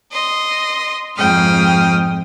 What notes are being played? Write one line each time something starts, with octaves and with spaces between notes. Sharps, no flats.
D#5 C6
F2 G#2 G#3 G5 D#6 F6